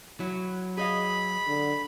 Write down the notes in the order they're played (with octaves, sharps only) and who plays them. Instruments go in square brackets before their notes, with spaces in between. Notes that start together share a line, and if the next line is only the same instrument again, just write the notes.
[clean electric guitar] F#3 [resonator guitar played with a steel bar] E4
[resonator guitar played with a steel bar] G#4 D#5 F5 [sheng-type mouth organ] B5
[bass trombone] D3